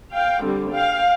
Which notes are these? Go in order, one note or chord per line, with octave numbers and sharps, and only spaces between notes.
F5 G5
D3 G3 C4
F5 G5